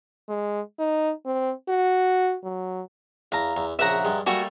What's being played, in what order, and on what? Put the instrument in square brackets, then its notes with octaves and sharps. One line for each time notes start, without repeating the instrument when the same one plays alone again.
[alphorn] G#3
D#4
C4
F#4
F#3
[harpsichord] E2 [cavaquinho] F5 A#5
[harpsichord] E2
[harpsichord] A#1 C#3 [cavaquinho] E5 F#5 A#5
[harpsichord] G2 G#3
[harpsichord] G3 A3 A#3 [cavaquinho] F#4 G#5